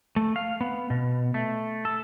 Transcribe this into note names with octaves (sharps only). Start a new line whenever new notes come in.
A3
F5
B3
B2
A3
A4